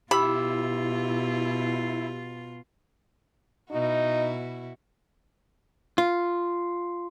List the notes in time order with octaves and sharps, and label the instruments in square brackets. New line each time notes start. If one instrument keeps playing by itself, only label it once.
[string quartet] B2 F4 [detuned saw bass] E4 [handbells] G4 E6 [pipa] B5
[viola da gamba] B2 E4 F#4 [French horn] D#4
[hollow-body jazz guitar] F4